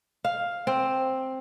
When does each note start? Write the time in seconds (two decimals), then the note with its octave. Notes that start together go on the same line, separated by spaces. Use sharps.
0.24 F5
0.67 C4